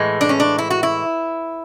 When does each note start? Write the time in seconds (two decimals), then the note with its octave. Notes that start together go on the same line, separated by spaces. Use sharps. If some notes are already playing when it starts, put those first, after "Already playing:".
Already playing: A2 E3 G#3
0.21 D4
0.29 C#4
0.40 D4
0.58 E4
0.70 F#4
0.83 E4